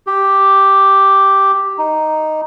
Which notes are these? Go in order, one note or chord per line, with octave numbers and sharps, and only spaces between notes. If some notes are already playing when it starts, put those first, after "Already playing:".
G4
D#4